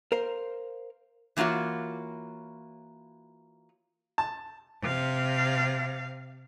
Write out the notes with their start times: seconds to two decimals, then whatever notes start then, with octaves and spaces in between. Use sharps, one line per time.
0.12 A#4 C5 F5
1.37 E3 A#3 F4 F#4 C#5
4.18 A5
4.82 C3 F5